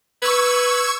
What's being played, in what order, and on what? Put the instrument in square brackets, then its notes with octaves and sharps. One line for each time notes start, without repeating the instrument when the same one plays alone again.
[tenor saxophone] B4 [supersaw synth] C#6 E6 G#6